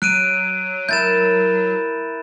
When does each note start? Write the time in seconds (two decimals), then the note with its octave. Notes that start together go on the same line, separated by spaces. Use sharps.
0.02 F#3 F#6 D7 D#7
0.89 E4 A#4 G6 A6 E7